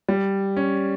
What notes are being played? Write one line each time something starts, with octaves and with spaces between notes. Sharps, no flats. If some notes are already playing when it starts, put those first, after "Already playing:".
G3
C#4